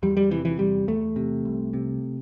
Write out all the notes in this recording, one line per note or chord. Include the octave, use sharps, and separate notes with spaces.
E2 G3
G3
C3 E3
E3
E2 G3
E2 A3
C3
C2
C3